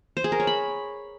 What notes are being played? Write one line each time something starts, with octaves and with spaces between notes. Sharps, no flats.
C5
G#4
A#4
C#5
B5